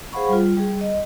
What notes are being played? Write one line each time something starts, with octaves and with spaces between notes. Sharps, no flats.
G#4 C5 F5 F#5 B5 C#6
G3 F4
G3 G#4
D#5